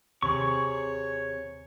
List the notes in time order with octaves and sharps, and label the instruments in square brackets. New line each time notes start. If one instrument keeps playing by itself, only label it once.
[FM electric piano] D#2 [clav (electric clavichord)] C3 [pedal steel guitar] G#4 C#6 [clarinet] C#5